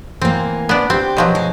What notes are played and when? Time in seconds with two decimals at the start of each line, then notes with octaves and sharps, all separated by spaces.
0.21 E3 A#3 C4
0.69 B3 D4
0.90 C4 G4
1.17 B2 F3 F#3
1.35 G#3